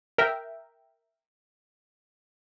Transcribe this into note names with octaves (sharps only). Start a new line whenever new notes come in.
A#4 E5 G5